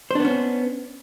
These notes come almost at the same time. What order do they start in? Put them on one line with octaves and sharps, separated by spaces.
C5 D4 B3 C#4